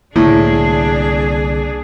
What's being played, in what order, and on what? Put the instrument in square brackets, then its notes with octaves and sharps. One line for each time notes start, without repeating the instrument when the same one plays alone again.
[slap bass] C2 D3 A#3 [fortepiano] A2 [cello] D4 G#4